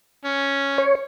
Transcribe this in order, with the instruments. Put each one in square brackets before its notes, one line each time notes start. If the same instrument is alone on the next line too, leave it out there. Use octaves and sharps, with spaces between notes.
[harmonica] C#4
[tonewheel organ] C#5